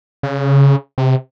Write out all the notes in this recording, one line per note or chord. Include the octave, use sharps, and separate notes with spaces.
C#3
C3